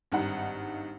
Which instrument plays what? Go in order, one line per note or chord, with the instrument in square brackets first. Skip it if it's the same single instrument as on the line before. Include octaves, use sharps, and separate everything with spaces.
[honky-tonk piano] G#1 G2 D#4 F#5